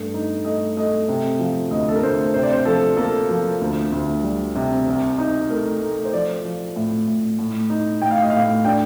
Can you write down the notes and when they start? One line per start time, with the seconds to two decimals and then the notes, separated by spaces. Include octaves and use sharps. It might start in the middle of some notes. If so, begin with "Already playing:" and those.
Already playing: G2 A3
0.14 D#4
0.45 A3 D#5
0.77 A3 D#5
1.08 C3
1.39 F3
1.71 D2 D#5
1.88 A4
1.95 A#4
2.03 D2 C5
2.34 C3 C5
2.43 D5
2.53 C5
2.65 F3 A4
2.97 A#3 A4
3.29 F3
3.61 D2
3.92 D2
4.23 G3
4.56 C3
4.87 C2
5.18 D#4
5.50 A3 A#4
5.81 A3
6.05 C5
6.13 F3 D5
6.45 F3
6.76 A2
7.08 A2
7.39 A2
7.70 D#4
8.02 A2 G5
8.11 F5
8.21 D#5
8.30 A2 F5
8.65 D4 G5